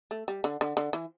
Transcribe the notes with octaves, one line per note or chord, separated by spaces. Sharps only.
A3
G3
D3
D3
D3
E3